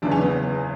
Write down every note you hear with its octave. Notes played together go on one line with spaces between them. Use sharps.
F#1 E2 C#3 E3 D4
C#4
B3